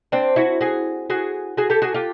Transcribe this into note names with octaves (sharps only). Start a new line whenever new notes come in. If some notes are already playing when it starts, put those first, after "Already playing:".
C4 D4
E4 F#4
F#4 G#4
F#4 G#4
F#4 G#4
G4 A4
F#4 G#4
F4 G4